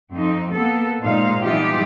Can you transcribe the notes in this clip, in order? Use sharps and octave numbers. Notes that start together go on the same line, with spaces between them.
F2 C4 D#4
A#3 B3 A4
A#2 G#3 D#4 C5 F5
E3 G3 B3 D#4 F4 G4